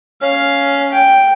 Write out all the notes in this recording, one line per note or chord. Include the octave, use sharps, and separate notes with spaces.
C#4 F5
G5